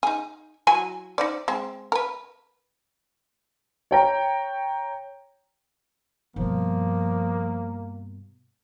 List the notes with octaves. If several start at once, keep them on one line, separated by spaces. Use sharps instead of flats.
D#4 G#4
F#3 E4 G#5
D#4 C5 D5
G#3 C4
A#4 B4
C#5 G5 A#5
G2 B2 F3 A#3